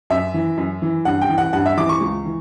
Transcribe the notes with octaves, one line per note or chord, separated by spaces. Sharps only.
F#2 E5
E3
F#2
E3
G2 F#5
G5
E3
F#5
G2 F#5
E5
E3 D6
C#6
C#2
E3